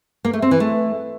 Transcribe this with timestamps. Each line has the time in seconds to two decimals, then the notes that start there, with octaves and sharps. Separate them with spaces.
0.25 A#3
0.33 A3
0.42 C4
0.51 E3
0.60 A3